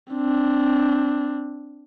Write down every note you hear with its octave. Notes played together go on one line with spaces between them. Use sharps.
C4 D4